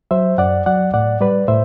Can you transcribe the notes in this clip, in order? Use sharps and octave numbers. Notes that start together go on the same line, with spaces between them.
F#3 C5 E5
F#2 D5 F#5
F#3 D5 F#5
A2 D5 F#5
G3 B4 D5
A2 C5 E5